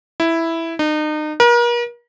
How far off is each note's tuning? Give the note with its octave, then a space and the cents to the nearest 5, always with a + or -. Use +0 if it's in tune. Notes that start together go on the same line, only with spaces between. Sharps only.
E4 +0
D#4 -35
A#4 +40